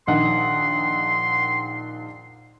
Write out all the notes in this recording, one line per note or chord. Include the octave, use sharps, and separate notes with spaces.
A#1 D#3 F#5 C6